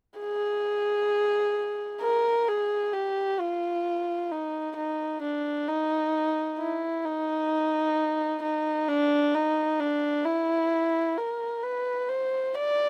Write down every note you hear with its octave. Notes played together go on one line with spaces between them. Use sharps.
G#4
A#4
G#4
G4
F4
D#4
D#4
D4
D#4
E4
D#4
D#4
D4
D#4
D4
E4
A#4
B4
C5
D5